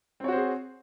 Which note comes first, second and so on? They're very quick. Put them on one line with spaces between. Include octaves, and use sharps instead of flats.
C4 C#5 F#4 C5 G#4